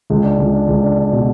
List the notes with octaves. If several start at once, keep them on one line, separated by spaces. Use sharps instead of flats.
C#2
D4
C#2
D4
C#2
D4
D4
B2